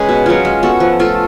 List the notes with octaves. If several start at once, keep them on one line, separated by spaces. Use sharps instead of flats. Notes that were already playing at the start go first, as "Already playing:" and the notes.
Already playing: G#3 C#4 G#4 B4
B2
F#3 C#4 F4
G#3
B3 F#4 A4
F3
A3 F4 A4